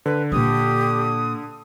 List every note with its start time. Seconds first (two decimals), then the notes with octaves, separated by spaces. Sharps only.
0.06 D3 B4
0.32 A#2 A#3 G4 D#6